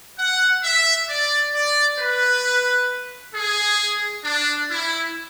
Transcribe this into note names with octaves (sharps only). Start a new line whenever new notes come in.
F#5
E5
D5
D5
B4
G#4
D4
E4